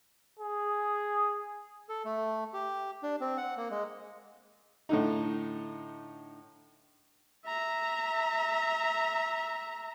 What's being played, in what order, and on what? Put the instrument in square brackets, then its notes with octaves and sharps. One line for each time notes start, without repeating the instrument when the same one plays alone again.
[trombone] G#4
[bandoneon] A4
A3
G4
D4
C4
F#5
A#3
G#3
[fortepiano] A2 D3 D#4
[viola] E5 A#5